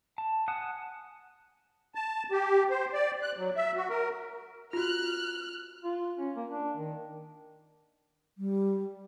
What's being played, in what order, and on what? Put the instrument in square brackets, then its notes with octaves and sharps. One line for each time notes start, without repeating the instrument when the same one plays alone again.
[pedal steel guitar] A5
F#5 G#5 A5 D#6 F#6
[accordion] A5
G4
C5
D5
F#6
F#3
E5
F#4
A#4
[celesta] F4 F#4 [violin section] F6 F#6
[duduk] F4
C#4
A#3
D4
D#3
[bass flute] G3